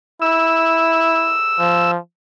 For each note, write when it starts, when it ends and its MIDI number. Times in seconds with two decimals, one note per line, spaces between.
0.22 1.36 64
0.22 1.91 88
1.60 1.98 53